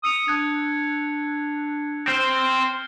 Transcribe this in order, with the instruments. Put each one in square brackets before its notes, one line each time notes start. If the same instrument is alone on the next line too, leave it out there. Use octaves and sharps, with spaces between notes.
[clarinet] D#6 [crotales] E6 C#7 F7
[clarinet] D4 [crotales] F#6 G#6
[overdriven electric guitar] C4 C5 [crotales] F6 G6 G7